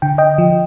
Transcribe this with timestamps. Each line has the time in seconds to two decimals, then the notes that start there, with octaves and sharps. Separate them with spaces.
0.02 D3 G5
0.18 D#5 G5
0.38 F3